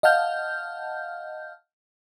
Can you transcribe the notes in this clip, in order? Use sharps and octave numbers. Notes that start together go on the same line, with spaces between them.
D#5 F5 F#5 A5 F6 G6